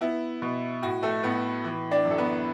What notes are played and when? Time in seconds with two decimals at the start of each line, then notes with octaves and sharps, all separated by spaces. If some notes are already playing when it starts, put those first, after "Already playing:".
0.01 B3 E4
0.42 B2
0.82 A2 F#4
1.03 A3 A4
1.23 A2 B3 B4
1.64 E3
1.91 D4 D5
2.05 F#2
2.11 A4
2.18 B3 B4